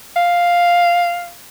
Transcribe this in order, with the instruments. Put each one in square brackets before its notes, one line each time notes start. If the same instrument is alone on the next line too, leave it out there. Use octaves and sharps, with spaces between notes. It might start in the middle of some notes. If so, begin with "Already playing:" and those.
[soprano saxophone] F5